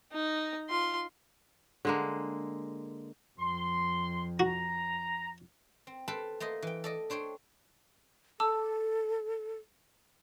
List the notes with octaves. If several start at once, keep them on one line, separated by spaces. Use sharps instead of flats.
D#4 A#5
F4 C6
D3 G#3 A#3
F2 C6
F#4 A#5
C4
A4 B4 C5 F5 G5 A5
A3 A#3 C5 D#5
E3 G5
A4 D5 D#5
D4 C5 C#5 G5
A4 A5 D6 E6